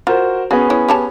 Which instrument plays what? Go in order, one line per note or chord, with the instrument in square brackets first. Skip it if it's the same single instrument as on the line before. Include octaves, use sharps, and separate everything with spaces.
[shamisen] F4 [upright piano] F#4 A#4 C5
[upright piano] B3 C#4 G#4 [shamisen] F#4
[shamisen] E4 C#5
G4 C#5 A5